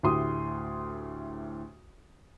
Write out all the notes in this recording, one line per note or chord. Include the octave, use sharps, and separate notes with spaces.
D2 A2 G4 C6 D#6